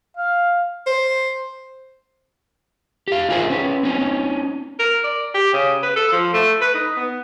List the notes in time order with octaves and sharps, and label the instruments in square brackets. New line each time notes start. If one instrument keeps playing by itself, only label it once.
[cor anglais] F5
[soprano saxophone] C5
[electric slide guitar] G4 F5
D#4 F4 G#4 A#4 C5 E5
C#4 B4
C4 C#4 D#4
[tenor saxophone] A#4
D5
G4
C#3
B4
A4
F3
A3
B4
D#4
B3